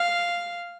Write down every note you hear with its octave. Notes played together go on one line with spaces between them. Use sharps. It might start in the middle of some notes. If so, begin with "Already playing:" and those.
Already playing: F5